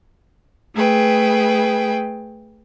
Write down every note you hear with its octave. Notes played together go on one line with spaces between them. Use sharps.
A3 G#4 B4 G5